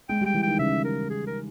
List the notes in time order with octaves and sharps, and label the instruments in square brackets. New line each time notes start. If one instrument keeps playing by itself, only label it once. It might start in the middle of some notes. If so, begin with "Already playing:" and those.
[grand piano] G#3 [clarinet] G5
[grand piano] G3 [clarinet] G5
[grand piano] E3
[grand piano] D#3 [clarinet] G5
[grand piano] C#3 [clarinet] E5
[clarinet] A#4
G#4
A#4